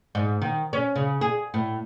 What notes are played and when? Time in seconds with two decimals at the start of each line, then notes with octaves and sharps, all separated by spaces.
0.15 G#2
0.42 D#3
0.73 C#4
0.96 C#3
1.21 G#4
1.54 A2